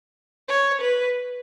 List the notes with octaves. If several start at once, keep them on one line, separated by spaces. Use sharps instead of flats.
C#5
B4